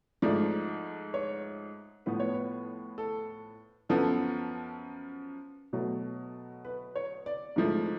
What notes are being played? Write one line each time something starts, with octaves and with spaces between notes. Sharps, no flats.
G#2 F3 A3 D5
C#5
A2 F3 B3 B4
C#5
B4
A4
F#2 F3 B3 A4
B2 F#3 A3
B4
C#5
D5
G#2 F3 A3